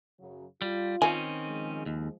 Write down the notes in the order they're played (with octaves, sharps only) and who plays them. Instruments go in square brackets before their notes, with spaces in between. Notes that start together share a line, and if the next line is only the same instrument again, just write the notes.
[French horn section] F#2 C#3 F#3
[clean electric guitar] G3 [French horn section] F4
[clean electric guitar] D#3 C4 C#4 [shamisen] G#5
[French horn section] F3 G#3
[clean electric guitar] D#2